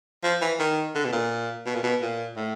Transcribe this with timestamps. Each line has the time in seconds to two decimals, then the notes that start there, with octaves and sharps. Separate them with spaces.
0.24 F3
0.41 E3
0.59 D#3
0.95 D3
1.05 B2
1.12 A#2
1.66 B2
1.75 A#2
1.83 B2
2.02 A#2
2.37 A2